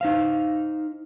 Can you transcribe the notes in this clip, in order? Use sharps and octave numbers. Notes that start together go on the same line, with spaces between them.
D#4 C5 F5